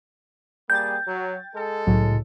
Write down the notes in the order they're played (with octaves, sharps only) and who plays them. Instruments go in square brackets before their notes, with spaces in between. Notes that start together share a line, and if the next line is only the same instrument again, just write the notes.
[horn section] G3 A#3 G#4 [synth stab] G5 A6 [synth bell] G6
[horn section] F#3
G#3 A4
[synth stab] C2 C#3 F#3 [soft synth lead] A2